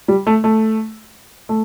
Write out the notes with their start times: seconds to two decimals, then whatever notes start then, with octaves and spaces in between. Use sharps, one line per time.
0.08 G3
0.27 A3
0.44 A3
1.49 A3